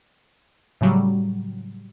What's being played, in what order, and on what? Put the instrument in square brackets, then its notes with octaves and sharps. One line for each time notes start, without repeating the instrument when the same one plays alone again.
[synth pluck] A2 C#3 F#3 G3